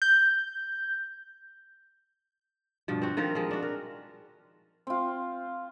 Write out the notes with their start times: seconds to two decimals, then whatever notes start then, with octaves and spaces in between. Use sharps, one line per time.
0.02 G6
2.88 G2 B2 F3
3.02 C4 F#4
3.17 D#3 F3 F4 A#4
3.35 F3 G#3
3.51 D4 F#4
3.63 A#4
4.87 C4 F4